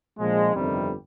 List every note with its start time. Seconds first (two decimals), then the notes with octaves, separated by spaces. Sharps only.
0.18 A#1 A#2 F3 G#3
0.54 G1 F2 C3 D#3 G3